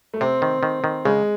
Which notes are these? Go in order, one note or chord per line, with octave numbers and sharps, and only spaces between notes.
A3
C3 C4
D#3
D#3
D#3
C#3 G#3